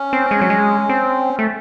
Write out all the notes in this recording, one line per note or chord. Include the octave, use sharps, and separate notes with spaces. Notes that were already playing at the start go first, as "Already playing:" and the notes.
Already playing: C#4
C4
G#3
F#3
G#3
C4
A3